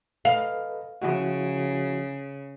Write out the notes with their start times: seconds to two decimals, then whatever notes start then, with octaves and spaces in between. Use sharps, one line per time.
0.25 A4 B4 D#5 F5
1.02 C#3 F3 E4 F#4